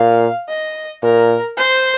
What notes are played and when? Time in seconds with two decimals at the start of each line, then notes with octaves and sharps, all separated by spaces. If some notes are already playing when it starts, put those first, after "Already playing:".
Already playing: A#2 F5
0.49 D#5
1.03 A#2 A#4
1.57 C5